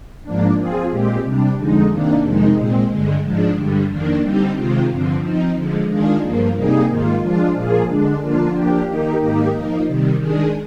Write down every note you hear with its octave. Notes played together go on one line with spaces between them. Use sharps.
G#2 F3 A#3 D4
F3 C4 F4 G#4
A#2 G#3 C4 G4
C3 G3 D4
F2 D3 G#3 D#4
C3 D#3 A#3 D4
F2 C3 D#3 G#3 D#4
A#2 G#3 C4
G2 D3 G#3
G#2 F3 G#3 D4
G2 D3 G3
F2 D#3 A#3 D4
D3 G3 C4 D#4 G4
C3 D#3 G#3 C4 F4
G2 D3 F3 C4
F3 C4 D#4
D3 F3 G#3
D#3 G#3 D4 F4 G#4
G2 F3 A#3
C3 G3 A#3 D#4 G#4
G#2 D#3 A#3 F4
F3 G#3 D4 F4
A#2 F3 A#3 F4 G#4
D3 G#3 D4
D3 F3 A#3 D4 F4
F3 A#3 D4 G4
D#3 A#3 D#4 G4
G#2 D#3 A#3 D#4 G4
F3 A#3 D#4
C3 D#3 G3
D#3 G#3 D4 G#4